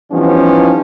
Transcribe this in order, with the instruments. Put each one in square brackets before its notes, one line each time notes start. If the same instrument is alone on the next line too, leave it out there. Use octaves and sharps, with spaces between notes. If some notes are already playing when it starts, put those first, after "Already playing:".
[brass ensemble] E3 F3 G3 B3 C#4 D#4